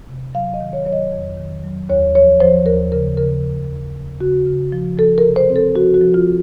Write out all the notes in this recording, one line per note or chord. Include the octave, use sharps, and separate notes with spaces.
C3
F#3 F5
D#5
D#3
C#5
F#3 C#5
D#5
F2
D#3
F#3
D#2 C#5
F3 C#5
F3 C5
D#2 A#4
C#3 A#4
C#3 A#4
C#3
F3
C#3
C#3 F#4
C#3
F3
F3 A4
A#4
C3
C5
C4
A4
F3 F#4
F#4
F3
F4
C4